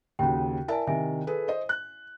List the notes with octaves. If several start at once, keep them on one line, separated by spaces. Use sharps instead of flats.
D#2 C#3 F#4 G5
E4 A#4 D5 E5 G#5 A5
C3 D#3 E5 G#5
G#4 A4 B4
C5 D#5
F#6